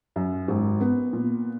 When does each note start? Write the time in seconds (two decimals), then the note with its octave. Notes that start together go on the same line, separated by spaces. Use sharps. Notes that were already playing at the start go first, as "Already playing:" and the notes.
0.16 F#2
0.48 G#1
0.81 B3
1.13 A#2